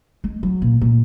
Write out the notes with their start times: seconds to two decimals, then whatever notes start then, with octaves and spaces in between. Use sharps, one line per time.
0.24 G#3
0.43 F#3
0.62 A#2
0.81 A#2